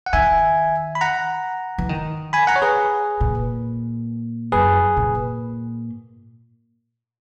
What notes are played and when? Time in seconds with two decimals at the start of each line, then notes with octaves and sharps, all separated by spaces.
0.06 F#5
0.13 D#3 E5 G#5
0.95 B5
1.01 F#5 A#5
1.78 E3
1.89 D#3
2.33 G#5 B5
2.47 F#5 A#5
2.56 C#5
2.62 G#4 B4
3.21 A#2
4.52 F#2 G#4 B4
4.97 A#2